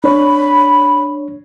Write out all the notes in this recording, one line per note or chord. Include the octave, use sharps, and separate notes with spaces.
D4 C#5 B5